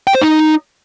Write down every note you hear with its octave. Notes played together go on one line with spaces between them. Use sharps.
G5
C5
D#4